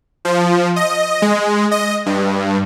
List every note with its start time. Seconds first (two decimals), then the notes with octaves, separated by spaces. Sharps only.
0.25 F3
0.76 D#5
1.22 G#3
1.71 D#5
2.06 G2